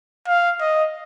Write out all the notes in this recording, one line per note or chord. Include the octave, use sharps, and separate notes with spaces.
F5
D#5